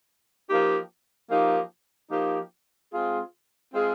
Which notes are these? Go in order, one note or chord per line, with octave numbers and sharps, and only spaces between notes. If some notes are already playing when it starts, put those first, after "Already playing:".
F3 A#3 D#4 G4
F3 A#3 D#4 G4
F3 A#3 D#4 G4
G#3 C4 F4 G#4
G#3 C4 F4 G#4